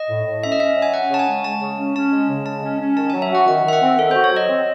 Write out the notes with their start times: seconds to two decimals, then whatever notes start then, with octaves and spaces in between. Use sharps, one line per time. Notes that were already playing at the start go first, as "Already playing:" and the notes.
Already playing: D#5
0.09 A2
0.26 A2
0.43 C#4 E5
0.52 D#5
0.60 C#4 E5
0.77 F#3
0.82 G#5
0.94 C#4 F#5
1.10 C#3 A5
1.19 G#5
1.28 G#3
1.44 G#3 A5
1.61 C#3
1.78 C#4
1.95 C#4 A5
2.12 G#3
2.29 C#3
2.46 G#3 A5
2.63 C#4
2.80 C#4
2.97 D#3 A5
3.10 F#3 G#5
3.22 E5
3.31 F#4 F#5
3.47 D#3 F#5
3.64 D#3 E5
3.73 F#5
3.82 C4
3.98 D#3 A4
4.11 F#4 C5
4.24 C#5
4.32 F#3 D#5
4.49 C4